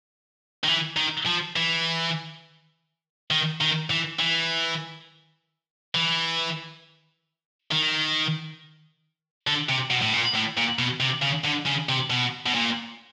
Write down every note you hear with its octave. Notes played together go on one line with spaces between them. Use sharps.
D#3
E3
D#3
F3
E3
D#3
D#3
E3
E3
E3
D#3
D3
C3
B2
A2
A#2
A2
A#2
B2
C3
C#3
D3
C#3
C3
B2
B2
A#2